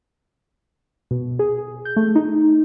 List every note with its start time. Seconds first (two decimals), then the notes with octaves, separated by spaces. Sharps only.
1.11 B2
1.39 G#4
1.85 G6
1.96 A3
2.15 D#4